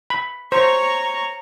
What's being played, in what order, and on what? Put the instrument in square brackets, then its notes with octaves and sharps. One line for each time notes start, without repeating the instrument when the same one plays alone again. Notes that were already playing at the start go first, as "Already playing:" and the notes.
[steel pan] B5
[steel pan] C5 [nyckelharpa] C#5 C#6 [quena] A#5